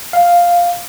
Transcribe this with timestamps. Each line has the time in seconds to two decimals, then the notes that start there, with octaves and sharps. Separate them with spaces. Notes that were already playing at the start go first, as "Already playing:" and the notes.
0.13 F5